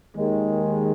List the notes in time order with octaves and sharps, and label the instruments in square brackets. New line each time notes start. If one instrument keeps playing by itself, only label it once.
[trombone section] D#2 D#3 G#3